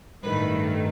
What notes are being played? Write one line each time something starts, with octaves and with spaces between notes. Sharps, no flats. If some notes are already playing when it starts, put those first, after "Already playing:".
A1 G2 D#3 A3 B4